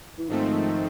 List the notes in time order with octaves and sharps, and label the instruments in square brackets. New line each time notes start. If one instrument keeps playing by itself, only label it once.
[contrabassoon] E3
[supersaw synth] G#2 F3 A3 C4 [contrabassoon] D#3